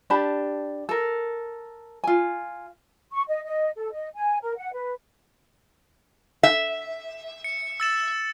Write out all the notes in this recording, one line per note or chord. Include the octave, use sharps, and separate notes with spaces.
D4 G4 A5 B5
A4 A#4
F4 G#5
C#6
D#5
D#5
A4
D#5
G#5
A#4
F#5
B4
E5
C#7
E6 A6 E7